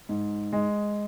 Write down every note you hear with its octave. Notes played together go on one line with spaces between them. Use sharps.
G#2
G#3